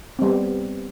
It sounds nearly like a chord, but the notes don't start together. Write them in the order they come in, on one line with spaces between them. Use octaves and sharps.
C4 G3 B3